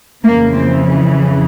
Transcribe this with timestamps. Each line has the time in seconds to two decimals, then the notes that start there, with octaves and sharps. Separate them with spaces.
0.24 F2 C#3 E3 A#3
0.53 C4